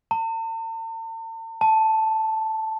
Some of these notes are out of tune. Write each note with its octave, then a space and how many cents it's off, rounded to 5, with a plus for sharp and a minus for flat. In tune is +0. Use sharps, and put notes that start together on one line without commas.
A5 +45
A5 +0